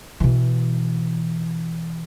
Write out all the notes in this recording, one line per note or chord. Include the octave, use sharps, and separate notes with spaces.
B2 E3